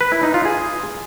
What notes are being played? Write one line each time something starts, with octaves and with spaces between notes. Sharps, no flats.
B4
E4
D#4
F4
G#4